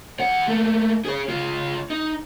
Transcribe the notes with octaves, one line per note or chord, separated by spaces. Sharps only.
E2 F#5
A3 A#3
G#4 C#5
C#2 F4
D#4